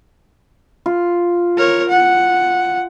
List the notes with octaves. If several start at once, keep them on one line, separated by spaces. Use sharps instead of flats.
F4
A#4 C#5
F#5